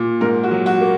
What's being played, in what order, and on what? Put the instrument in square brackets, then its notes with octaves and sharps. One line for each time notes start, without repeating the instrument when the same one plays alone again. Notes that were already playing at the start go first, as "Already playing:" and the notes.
Already playing: [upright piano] A#2
G#2 A#4
F#4
F#3
F#4
A#3